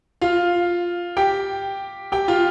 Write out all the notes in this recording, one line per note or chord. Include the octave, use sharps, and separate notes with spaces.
F4 F5
G4 G5
G4 G5
F4 F5